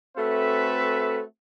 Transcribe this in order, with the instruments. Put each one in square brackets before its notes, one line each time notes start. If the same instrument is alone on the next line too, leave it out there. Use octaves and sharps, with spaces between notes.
[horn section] A3 C4 F#4 A4 B4 E5